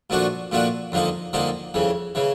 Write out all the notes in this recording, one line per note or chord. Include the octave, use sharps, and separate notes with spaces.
A#2 F3 A3 D4 F#4
A#2 F3 A3 D4 F#4
F2 D3 F3 A#3 D#4
F2 D3 F3 A#3 D#4
F2 C#3 E3
C#3 E3